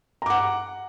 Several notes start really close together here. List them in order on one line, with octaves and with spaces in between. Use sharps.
A#5 D6 F#5